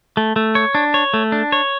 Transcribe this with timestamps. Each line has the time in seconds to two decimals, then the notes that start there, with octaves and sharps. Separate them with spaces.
0.17 A3
0.36 A3
0.55 C#5
0.75 D4
0.94 C#5
1.14 A3
1.32 D4
1.52 C#5